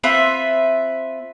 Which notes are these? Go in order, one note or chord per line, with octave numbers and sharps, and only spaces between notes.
C4 F4 B4 E5